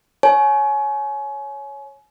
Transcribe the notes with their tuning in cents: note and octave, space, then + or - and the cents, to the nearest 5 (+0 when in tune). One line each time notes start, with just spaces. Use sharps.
C#5 +0 G#5 +30